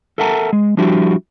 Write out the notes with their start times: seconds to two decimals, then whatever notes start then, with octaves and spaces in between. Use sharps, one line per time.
0.18 A4 A#4 E5 F#5 A5 A#5
0.53 G#3
0.77 F3 G3 D4 E4 F#4 G4